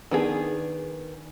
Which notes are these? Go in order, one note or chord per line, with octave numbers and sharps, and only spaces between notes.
D#3 B3 D4 G#4